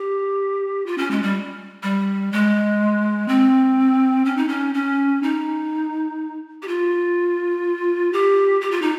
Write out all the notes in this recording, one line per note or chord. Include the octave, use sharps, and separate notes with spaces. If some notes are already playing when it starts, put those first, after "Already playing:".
Already playing: G4
F4
C#4
G#3
G3
G3
G#3
C4
C#4
D#4
C#4
C#4
D#4
G4
F4
G4
G4
F4
D#4